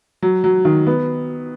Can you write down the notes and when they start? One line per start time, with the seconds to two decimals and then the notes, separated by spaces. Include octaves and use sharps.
0.22 F#3
0.44 F#3
0.65 D#3
0.87 B3